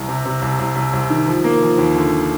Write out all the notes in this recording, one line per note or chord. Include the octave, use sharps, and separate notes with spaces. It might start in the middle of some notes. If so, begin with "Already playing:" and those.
Already playing: C2
C3
C3
C2
C2
C2
C2
D#3
F3
A#3
F3
D#2
D3